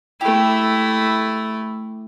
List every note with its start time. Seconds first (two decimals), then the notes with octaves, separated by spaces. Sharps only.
0.21 A3 E4 G4